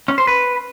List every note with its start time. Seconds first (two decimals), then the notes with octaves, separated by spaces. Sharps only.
0.08 C#4
0.18 C5
0.27 B4